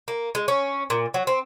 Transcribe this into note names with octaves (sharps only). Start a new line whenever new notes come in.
A#3
G#3
C#4
A#2
F#3
C4